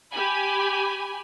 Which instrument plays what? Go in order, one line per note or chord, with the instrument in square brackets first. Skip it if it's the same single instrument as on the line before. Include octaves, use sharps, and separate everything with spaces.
[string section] G4 G#5 B5